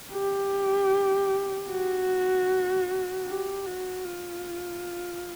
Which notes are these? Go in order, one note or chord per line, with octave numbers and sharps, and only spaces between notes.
G4
F#4
G4
F#4
F4